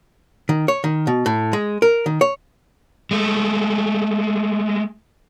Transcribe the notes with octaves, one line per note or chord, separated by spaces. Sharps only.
D#3
C#5
D#3
B2
A2
G#3
A#4
D#3
C#5
G#3 A3